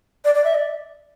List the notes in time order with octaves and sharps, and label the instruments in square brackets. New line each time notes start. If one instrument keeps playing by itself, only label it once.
[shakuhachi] D5
D5
E5
D5